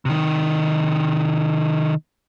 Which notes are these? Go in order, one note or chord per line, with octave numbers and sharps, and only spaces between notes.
C3 D#3